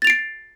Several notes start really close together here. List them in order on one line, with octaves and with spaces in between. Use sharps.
A6 F7 D7 C7